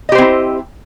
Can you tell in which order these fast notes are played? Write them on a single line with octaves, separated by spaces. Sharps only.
D#5 G4 C5 C4 E4